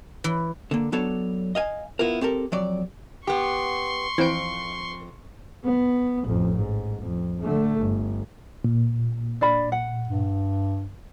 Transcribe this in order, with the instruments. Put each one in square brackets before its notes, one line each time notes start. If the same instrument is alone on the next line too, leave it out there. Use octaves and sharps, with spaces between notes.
[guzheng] E3
[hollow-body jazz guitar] D3 A#3
F#3 B3 D4 A4 C#5
D#5 F5 G#5
B3 E4 F4 A#4
C4 G4 A4 A#4
F2 F#3 D5
[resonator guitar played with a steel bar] B3 G4 [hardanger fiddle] C6 C#6
[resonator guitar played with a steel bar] F2 [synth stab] E3 C4 D7
[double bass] B3
A1 F2
G#2
F2
D3 A3
G1
[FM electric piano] A#2
[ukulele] D4 D5 B5
F#5
[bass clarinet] G2